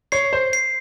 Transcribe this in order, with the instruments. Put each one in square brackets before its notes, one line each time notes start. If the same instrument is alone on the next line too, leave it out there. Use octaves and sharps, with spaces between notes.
[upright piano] C#5 [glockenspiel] C7
[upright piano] C5
[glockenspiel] C7